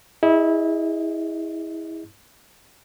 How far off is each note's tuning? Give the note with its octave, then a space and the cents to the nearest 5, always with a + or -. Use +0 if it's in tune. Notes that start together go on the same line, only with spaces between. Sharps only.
E4 -20 G#4 -20 D#5 +0